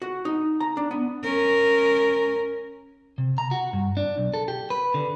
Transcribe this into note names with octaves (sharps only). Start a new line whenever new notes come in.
F#4
D#4
A#5
D4
B3
C#4 A#4
C3
A#5
F#4
G2
D4
B1
A4
G4
B4
D3